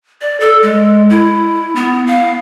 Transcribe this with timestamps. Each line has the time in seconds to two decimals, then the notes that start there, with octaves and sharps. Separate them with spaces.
0.21 D5
0.40 A4
0.63 G#3
1.10 E4
1.76 B3
2.07 F5